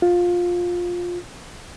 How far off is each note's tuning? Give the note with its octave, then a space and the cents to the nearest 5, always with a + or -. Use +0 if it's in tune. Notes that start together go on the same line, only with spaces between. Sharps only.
F4 +15